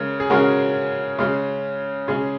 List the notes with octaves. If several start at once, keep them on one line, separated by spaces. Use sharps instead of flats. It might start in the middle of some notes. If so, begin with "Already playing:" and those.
Already playing: C#3 G#3 C#4 A#4
G#4
C#3 G#3 C#4 F#4 A#4
C#3 G#3 C#4
C#3 G#3 C#4 G#4